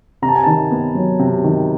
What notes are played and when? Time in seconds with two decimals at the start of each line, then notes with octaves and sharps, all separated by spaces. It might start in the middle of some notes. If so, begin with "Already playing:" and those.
0.22 C3 A#5
0.28 A5
0.36 G#5
0.44 D#3 A5
0.71 B3
0.95 F#3
1.19 C3
1.44 D#3